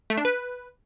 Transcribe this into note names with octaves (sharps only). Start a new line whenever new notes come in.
A3
D4
B4